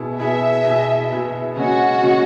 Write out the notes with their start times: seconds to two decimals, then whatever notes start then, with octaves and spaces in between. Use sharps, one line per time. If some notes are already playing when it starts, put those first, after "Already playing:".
Already playing: B2 B3 E4 G#4
0.19 B2 B3 E4 G#4 E5
0.65 B2 B3 E4 G#4
1.11 B2 B3 E4 G#4
1.56 C#3 G#3 C#4 F#4
2.03 C#3 G#3 C#4